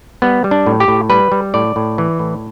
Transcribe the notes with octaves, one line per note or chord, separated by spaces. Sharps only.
G3 B3
G3
D4
A2
G4
A2
G3 B4
G3
A2 D5
A2
E3
A2